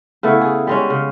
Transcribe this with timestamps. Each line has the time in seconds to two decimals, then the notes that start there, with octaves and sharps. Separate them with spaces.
0.23 C#3 A3 B3 E4
0.41 G#4
0.67 G3 G#3 C#4
0.90 C#3